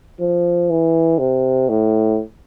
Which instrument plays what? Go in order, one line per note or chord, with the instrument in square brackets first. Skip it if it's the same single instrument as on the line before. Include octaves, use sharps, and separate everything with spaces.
[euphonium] F3
E3
C3
A2